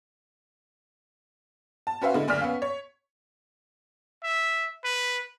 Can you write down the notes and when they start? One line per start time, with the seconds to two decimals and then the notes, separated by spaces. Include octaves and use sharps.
1.87 A5
2.02 C#4 F#4 B4 C5 E5 F5
2.14 D3 G#3 E4
2.28 F#1 D2 D5 F6 B6
2.41 B3 C#4 F5
2.62 C#5
4.24 E5
4.84 B4